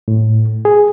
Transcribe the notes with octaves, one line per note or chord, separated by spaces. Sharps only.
A2
G#4